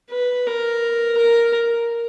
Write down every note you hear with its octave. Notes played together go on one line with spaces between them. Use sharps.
B4
A#4
A#4